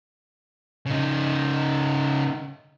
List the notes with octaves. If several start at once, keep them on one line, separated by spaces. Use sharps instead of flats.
C#3 D#4